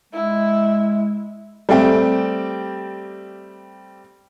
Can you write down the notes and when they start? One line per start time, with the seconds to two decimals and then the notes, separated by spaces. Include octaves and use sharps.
0.13 G#3 E4
1.69 G3 A3 C4 G4